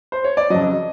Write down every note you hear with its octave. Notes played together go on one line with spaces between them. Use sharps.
C5
C#5
D5
F2 C#3 F#3 D#5